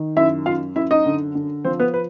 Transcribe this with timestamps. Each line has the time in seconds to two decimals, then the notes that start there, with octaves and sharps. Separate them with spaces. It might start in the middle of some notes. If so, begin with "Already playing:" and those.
Already playing: D#3
0.16 F#2 E4 E5
0.46 F#2 F4 F5
0.76 F#2 E4 E5
0.91 D#4 D#5
1.06 D3
1.35 D3
1.65 F3 C4 C5
1.80 B3 B4
1.94 B4